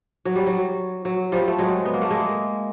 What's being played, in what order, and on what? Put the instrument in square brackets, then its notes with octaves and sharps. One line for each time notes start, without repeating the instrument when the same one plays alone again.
[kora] F#3
G3
F#3
F#3
F3 G3
A3
F#3 G#3
B3
A#3
A3
G#3 A#3